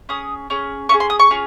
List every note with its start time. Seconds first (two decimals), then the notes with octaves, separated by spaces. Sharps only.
0.09 C#4 G#4 D#6
0.50 C#4 G#4
0.89 C#4 F4 C#6
0.94 G#4
1.00 C6
1.10 D#6
1.19 C#6
1.31 C#4 F4 G#4